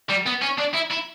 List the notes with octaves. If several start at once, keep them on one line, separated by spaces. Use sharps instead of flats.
G3
B3
C#4
D4
E4
E4